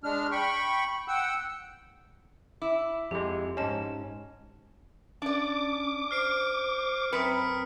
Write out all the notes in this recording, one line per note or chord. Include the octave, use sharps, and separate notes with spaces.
G#3 D4 F6
G5 B5 C#6
F#5 G5 E6
E4 D6
F2 G#3 G4
G#2 C#4 D#5 A5
C#4 D4 D5 D6
C5 F6 C7 D7
F#2 C4 B4 D#6 B6 C#7